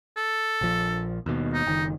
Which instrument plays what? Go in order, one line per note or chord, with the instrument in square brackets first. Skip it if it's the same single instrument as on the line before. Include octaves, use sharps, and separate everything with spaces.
[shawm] A4
[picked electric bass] A#1 F3
D#2 B2
[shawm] D#4
[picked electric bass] F#1 D#3